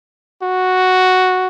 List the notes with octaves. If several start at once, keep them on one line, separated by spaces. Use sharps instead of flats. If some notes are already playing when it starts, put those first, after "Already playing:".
F#4